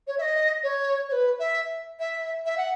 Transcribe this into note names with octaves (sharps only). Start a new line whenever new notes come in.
C#5
E5
D#5
C#5
C#5
B4
E5
E5
E5
F#5